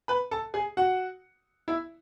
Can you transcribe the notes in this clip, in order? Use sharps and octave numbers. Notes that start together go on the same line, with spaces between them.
B4 B5
A4 A5
G#4 G#5
F#4 F#5
E4 E5